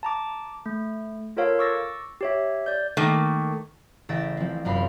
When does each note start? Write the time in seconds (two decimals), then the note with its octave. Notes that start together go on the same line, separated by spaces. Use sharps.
0.03 A5 A#5 D6
0.66 A3
1.37 F4 A4 A#4 C#5 F5
1.59 C#6 D6 E6 A6 A#6
2.21 G4 C#5 E5
2.66 D5 G6
2.97 D#3 A3 A#3
4.09 A1 C#3 E5 G5 A6 A#6
4.37 F3 C4
4.65 F1 F#2 F5 B5 C6